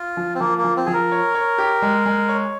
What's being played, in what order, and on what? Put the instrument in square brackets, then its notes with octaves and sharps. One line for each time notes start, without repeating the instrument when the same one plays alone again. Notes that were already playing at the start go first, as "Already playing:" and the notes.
Already playing: [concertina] F4
[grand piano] F3
[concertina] C4
[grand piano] F3 [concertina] A#3
[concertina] A#3
[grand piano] F3
[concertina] C4
[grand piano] F3 [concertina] G#4
[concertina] A#4
[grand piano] C#5
C#5
G4
G#3
G#3
C#5